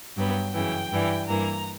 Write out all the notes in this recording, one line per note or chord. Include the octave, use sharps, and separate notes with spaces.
G2 F#3 B3 G5
F#2 C#3 E3 G5
G2 E3 G3
G2 E3 A#3 A#5